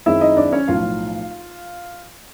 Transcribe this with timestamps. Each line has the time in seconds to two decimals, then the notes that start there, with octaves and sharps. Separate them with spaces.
0.06 F#2 D#3 G#3 C4 E4 E5
0.21 D#4 D#5
0.37 D4 D5
0.52 C#4 C#5
0.68 B1 A2 F3 F4 F5